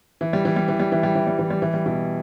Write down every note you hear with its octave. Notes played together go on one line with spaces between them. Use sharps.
E3
G3
E3
G3
E3
G3
E3
G3
E3
G3
E3
G3
E3
G3
B2 E3